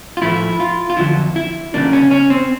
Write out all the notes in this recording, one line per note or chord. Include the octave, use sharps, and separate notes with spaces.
F4
A2 F3 A3 E4
F4
F4
F2 D3 F#3 E4
E4
C#3 F#3 A#3 D4
C#4
C#4
C4